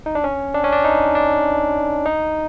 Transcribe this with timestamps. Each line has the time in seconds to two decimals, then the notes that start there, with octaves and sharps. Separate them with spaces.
0.06 D#4
0.15 D4
0.24 C#4
0.54 D4
0.64 C#4
0.73 D4
0.84 D#4
1.15 D4
2.06 D#4